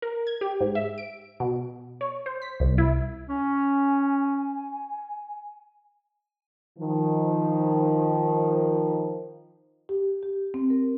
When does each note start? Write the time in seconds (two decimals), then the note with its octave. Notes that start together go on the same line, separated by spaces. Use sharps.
0.02 A#4
0.27 G#6
0.41 G4
0.61 G#2
0.75 E5
0.98 D7
1.40 B2
2.01 C#5
2.26 C5
2.42 B6
2.60 C2
2.78 E4
3.29 C#4 G#5
6.79 D#3 F3
9.89 G4
10.23 G4
10.54 C4
10.70 A#4